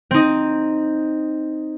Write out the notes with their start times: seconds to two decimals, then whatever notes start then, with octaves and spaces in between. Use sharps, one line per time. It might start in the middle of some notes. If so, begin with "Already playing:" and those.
0.11 C4 D#4